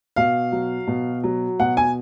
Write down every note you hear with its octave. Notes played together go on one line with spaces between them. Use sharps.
B2 F5
F#3
B2
F#3
B2 F#5
G#5